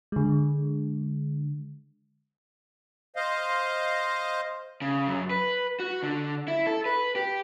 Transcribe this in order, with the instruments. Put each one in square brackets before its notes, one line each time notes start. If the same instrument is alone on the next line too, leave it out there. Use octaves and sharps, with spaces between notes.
[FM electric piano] D3 G#3
[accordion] C5 D#5 F5
[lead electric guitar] C#3
F#2
B4
F#4
D3
E4
A4
B4
G4